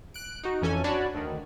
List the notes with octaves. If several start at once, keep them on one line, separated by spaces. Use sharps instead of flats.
F#6 D7
D#4 F#4
F2 E3 C#4 A4 G#5
D4 F#4 C#5 D5 A5 B5
D2 D3 D#3